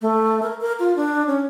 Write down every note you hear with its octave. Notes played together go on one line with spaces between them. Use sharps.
A3
A#4
A#4
F4
D4
C#4